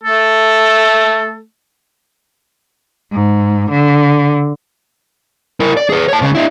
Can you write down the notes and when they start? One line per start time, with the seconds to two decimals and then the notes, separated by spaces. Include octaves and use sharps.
0.03 A3 A4
3.12 G#2
3.70 D3
5.60 E4 A#4
5.77 D5
5.89 G#4 B4
6.08 C#5 A5
6.22 C#2 C#3
6.35 D4 E4